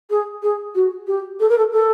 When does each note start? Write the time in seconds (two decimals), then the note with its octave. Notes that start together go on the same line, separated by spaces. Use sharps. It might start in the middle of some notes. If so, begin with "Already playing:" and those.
0.10 G#4
0.42 G#4
0.75 F#4
1.07 G4
1.40 A4
1.49 A#4
1.58 A4
1.72 A4